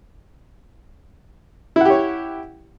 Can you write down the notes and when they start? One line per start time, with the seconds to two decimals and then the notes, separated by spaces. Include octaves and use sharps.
1.76 E4
1.81 F#5
1.85 G4
1.90 C#5